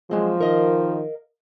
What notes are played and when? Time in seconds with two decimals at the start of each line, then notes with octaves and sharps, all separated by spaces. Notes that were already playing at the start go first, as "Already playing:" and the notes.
0.11 F3 F#3 G#3 C4
0.40 D#3 A#4 D#5 F5